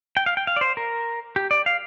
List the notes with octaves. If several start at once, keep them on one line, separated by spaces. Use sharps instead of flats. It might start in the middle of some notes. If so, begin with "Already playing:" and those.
G5
F5
G5
F5
D5
C5
A#4
G4
D5
F5